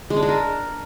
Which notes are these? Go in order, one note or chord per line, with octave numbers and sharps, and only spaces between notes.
G#3
D4
G#3
A#4